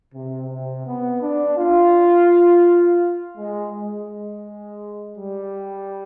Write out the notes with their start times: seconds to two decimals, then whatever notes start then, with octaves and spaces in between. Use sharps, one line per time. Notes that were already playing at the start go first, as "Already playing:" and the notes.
0.14 C3
0.50 C3
0.86 B3
1.21 D4
1.57 F4
3.38 G#3
3.73 G#3
5.17 G3